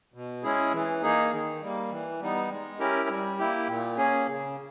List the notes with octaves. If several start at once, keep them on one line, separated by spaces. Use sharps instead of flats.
B2
G#3 C#4 E4 G#4
E3
A#3 D#4 G#4
D#3
G3 A#3
E3
G3 B3 D#4
G#3
C#4 E4 G4 A#4
G3
A#3 E4 G4
A#2
A#3 C#4 G#4
C#3